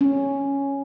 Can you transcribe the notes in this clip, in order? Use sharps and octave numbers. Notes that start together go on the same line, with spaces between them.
C#4